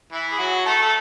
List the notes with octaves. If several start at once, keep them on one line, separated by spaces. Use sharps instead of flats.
E3 E4
G#4
F#3 F#4
A3 A4
A4